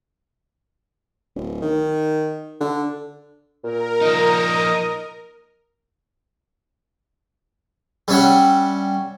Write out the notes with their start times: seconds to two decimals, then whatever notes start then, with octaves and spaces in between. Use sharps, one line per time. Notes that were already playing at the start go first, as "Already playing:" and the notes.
1.35 D1
1.62 D#3
2.60 D3
3.64 A#2 A#4
4.01 F3 D#4 D#5
8.08 G3 C#4 E5 F#5